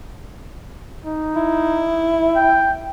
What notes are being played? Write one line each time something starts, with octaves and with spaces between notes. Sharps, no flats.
D#4
E4
G5